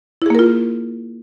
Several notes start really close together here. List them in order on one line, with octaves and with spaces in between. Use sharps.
E4 G#4 A#3 A#4 F4